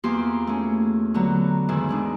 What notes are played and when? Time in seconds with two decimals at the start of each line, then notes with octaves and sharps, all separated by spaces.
0.04 E2 A#3 B3 F4 G4 C6
0.47 A3 C#4
1.14 D3 F#3 B3 A#5
1.68 E2 G#2 D#3 E3
1.89 G#3 D4 D#4